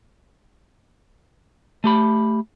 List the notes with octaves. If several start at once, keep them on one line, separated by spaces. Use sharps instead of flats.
A3 G4 B5